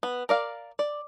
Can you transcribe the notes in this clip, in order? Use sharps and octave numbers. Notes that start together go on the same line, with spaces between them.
B3
A#4 D5 F5
D5